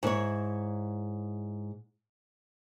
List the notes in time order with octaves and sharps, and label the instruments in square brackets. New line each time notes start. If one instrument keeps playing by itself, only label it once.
[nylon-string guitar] G#2 E4 B4 C#5